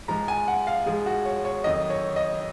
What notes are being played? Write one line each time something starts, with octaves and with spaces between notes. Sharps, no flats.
G#2 F3 G#3 A#5
G#5
F#5
F5
G#2 F3 G#3 G#4
F#4
C#5
C#5
F2 D#3 F#3 D#5
C#5
D#5